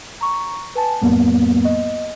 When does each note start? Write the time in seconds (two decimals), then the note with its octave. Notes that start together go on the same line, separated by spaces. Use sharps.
0.21 A#5 C#6
0.75 B4 G#5 A5
1.02 F2 A2 F#3 A#3 B3
1.65 D#5